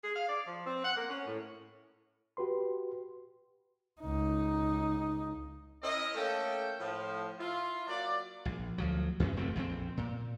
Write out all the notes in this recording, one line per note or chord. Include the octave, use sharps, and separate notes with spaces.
G#4
F5
D5
F3
C4
F#5
A#3
C#4
A2
F#4 G4 B4 C6
C#2 D#4
C#4 E4 A#4 D#5
A3 A#3 C#4 A4 G5
A2 F3
E4 F4
F#3 A#3 D5
A#1
D2 F3 F#3
F#2 E3 F#3 C#4
F1 E2 A3 C4
A#1 F2 D#3 C4
A#2